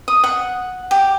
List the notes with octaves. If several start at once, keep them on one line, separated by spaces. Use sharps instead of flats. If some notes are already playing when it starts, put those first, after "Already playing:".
D#6
F#5
G4